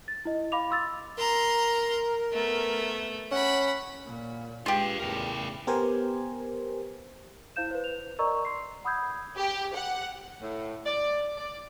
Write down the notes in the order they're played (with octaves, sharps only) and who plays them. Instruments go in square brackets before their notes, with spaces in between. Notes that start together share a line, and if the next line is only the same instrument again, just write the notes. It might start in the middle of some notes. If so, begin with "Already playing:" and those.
[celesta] A6
E4 D#5
F5 B5 D6 F7
C6 E6 A6
[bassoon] A#4 [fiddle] A#5 C6
[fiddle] A3 B3
[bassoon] C#4 [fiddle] F#5 B5
[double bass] A#2
[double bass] G#3 [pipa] F4 G4 [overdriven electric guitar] B4 F5
[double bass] A1 E2 [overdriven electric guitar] E4 A#4
[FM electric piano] B3 G4 A#4 C5 G#5
[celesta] E4 C5 F5 G6 E7
B4 C5
F7
A#4 D5 D#5 A#5 C#6 E6
C6 C7
F#5 B5 D#6 E6 G6 G#6
[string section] G4
F#5
[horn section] A2
D5
D5